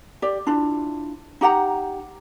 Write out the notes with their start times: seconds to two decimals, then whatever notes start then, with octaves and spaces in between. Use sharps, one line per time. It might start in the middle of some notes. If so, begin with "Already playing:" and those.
0.22 G4 D5
0.47 D4 E4 F4
1.41 D#4 G4 F#5 A#5